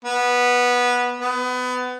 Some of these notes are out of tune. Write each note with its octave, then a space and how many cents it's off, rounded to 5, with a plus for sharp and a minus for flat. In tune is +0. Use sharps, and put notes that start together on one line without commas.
B3 -10
B3 +25